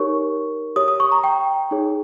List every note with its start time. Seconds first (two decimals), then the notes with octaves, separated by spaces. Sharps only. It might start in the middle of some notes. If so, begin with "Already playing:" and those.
Already playing: D#4 G4 A#4 C#5 C#6
0.76 G4 C#5 D#6
0.88 D#6
1.00 C#6
1.12 A#5
1.24 G5
1.71 D#4 G#4 C#5